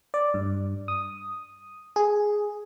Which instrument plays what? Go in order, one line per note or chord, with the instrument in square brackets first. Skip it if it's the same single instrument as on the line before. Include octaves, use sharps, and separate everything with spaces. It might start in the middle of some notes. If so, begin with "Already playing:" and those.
[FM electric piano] D5
G2
D#6
G#4